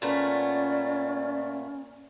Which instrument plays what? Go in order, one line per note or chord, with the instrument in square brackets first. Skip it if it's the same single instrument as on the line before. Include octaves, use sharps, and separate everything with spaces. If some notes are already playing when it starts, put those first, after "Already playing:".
[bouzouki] A#2 A3 B3 [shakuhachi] C#4 [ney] D5